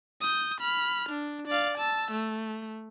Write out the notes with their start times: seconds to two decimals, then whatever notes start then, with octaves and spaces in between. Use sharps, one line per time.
0.21 D#6 G6
0.61 B5 F6
1.09 D4
1.48 D5 F5
1.78 A5 E6
2.12 A3